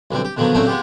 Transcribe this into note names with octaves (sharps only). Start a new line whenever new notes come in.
B1 D3 G3 C4
G4
B2 D3 D#3 F3 F#3 B3
A#2 C#3 F#3 A3 C4 A4
G#3 B3 F4 G4